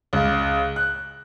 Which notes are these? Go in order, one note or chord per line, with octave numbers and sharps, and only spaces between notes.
C#2
F#6